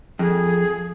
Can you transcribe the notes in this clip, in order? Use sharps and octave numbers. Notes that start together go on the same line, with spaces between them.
F2 G#4